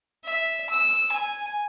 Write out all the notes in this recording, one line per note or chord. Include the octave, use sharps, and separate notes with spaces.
E5
E6
G#5